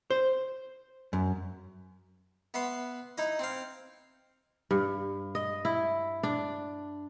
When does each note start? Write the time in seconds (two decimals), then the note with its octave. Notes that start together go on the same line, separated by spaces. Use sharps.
0.11 C5
1.13 F#2
2.54 B3 E5 B5 C6
3.18 D#4 E4 D#5
3.39 C4 F5
4.71 G2
5.35 D#5
5.65 E4
6.23 D4